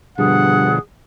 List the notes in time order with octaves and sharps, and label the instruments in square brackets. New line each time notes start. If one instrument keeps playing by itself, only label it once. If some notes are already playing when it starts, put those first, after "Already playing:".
[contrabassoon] G2 [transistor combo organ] B2 D3 F3 [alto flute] G#4 [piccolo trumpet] F#5